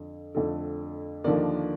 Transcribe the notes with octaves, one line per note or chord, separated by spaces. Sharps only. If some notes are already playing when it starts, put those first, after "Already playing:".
Already playing: F2 D3
F2 D3 A3
D#2 D3 F3 A#3 D5